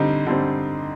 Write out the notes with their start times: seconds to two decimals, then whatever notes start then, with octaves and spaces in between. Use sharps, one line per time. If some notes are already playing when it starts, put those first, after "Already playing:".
Already playing: D3 G3 C4 D#4
0.27 D3 G3 C4